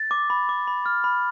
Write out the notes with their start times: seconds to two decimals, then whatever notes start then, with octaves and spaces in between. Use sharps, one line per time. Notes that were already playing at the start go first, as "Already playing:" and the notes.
Already playing: A6
0.11 D6
0.30 B5
0.49 D6
0.67 B5
0.86 F6
1.04 B5